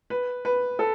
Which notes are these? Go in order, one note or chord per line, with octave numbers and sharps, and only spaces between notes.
B4
B4
A4